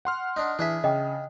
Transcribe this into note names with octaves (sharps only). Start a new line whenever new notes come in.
F#5 C6 F6
D4 D#4
E3 D4 G#4 E5
C#3 D#5 G5